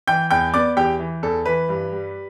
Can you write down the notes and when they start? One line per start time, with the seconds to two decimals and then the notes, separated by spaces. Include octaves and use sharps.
0.07 E3 G5 G6
0.31 E2 G5 G6
0.54 B3 D5 D6
0.77 E2 G4 G5
1.00 E3
1.23 E2 A4
1.46 E3 B4
1.69 G2
1.92 G3